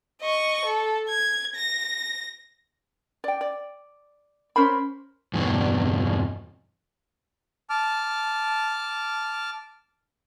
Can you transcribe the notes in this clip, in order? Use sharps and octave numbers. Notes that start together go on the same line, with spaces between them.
D#5 C#6
A4
G#6
A#6
D5 G5
D5
C#4 A#4 C5 B5
E2 G2 B2
A5 D6 F6